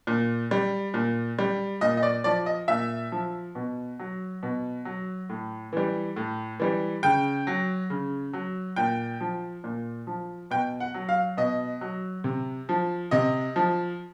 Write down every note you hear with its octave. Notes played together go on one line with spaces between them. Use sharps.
A#2
G3
A#2
G3
A#2 D#5
D#5
D5
F3 D5
D#5
A#2 E5
F3
B2
F#3
B2
F#3
A2
E3 G3
A2
E3 G3
C#3 G5
F#3
C#3
F#3
A#2 G5
F3
A#2
F3
B2 G5
F#5
F#3
F5
B2 D#5
F#3
C3
F3
C3 D#5
F3